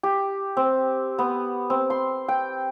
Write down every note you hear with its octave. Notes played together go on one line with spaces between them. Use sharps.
G4
C4
B3
C4
C6
G5